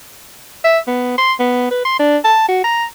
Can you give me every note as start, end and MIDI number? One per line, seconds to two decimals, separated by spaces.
0.64 0.79 76
0.88 1.14 59
1.18 1.33 84
1.39 1.70 59
1.71 1.85 71
1.85 1.95 84
1.99 2.17 62
2.24 2.43 81
2.49 2.62 66
2.64 2.85 82